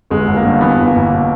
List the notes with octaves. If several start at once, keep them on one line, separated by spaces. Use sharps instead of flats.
G1 G#3
G1
A#3
G2
E3 B3
G1
A#3
G1
B2